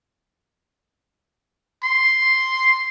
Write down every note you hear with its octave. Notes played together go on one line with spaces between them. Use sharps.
C6